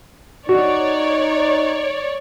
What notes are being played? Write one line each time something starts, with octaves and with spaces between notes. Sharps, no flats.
D#4 F#4 C#5 D5